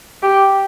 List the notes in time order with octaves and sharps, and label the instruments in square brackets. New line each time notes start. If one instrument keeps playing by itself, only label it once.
[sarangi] G4